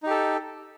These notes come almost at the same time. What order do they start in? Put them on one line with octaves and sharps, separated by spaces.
D#4 G4 A4